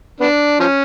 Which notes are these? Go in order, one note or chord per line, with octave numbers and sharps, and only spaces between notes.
B3 D4
F3 C#4